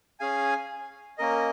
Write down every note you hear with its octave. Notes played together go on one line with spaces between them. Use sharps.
C#4 G#4 F5 G#5
A#3 C#4 A#4 D#5